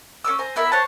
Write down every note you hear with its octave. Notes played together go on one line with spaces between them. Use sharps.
C#4 A4 D6 E6
C5 G#5 A#5
B3 E4 A#4 E5
C5 C#5 F#5 A5